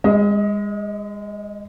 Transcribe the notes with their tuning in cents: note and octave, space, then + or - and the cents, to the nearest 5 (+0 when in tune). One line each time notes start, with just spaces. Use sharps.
G#3 -30 D#5 +25